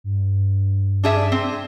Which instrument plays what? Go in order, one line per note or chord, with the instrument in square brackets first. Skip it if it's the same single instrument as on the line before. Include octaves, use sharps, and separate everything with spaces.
[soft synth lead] G2
[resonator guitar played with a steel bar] D4 G#4 E5
C4